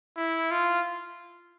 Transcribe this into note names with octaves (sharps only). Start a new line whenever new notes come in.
E4
F4